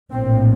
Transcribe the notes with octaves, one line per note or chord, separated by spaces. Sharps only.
A#1 A2 C4